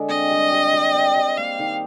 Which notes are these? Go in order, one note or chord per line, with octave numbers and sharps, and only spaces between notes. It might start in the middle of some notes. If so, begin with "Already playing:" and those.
Already playing: D3 G#3
C4 D#5
G3
G4
G3
C4
G3
A#3 F5
D#3